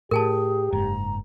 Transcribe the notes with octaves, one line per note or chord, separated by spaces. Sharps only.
A2 G4 G#4 A#4 G#5 A5
F#1 G#2 A#5